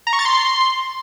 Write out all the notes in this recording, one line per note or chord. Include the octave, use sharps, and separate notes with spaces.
A#5
C#6
A6
C6